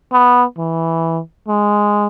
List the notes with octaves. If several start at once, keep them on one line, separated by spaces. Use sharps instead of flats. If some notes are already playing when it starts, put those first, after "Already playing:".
B3
E3
G#3